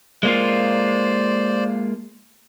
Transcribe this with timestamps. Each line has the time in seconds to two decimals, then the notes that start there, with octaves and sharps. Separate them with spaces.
0.23 G#3 A#3 F4 C5 D5